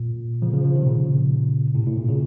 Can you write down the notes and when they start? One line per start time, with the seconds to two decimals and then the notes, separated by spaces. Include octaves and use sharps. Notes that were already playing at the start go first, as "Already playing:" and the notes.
Already playing: A#2
0.42 C#3 F3
0.53 C#3 F3
0.64 C#3 F3
0.75 C3 D#3
0.86 A#2 C#3
1.75 A2 C3
1.86 A2
1.97 A#2
2.08 A#2 C#3